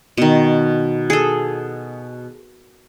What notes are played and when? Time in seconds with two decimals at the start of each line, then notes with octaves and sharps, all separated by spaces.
0.18 B2 D#3
1.10 G#4 A4